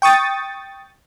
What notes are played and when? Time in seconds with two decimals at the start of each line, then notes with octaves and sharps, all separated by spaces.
0.02 G5 C#6 D#6 A6